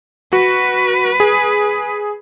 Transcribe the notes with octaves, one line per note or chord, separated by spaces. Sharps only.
F#4 B4
G#4